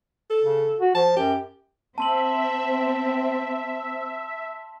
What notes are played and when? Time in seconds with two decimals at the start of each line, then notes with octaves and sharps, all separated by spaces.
0.30 A4
0.43 C#3
0.80 F#4
0.95 F3 A5
1.17 F#2 G4
1.98 C4 E5 A5 C6 F#7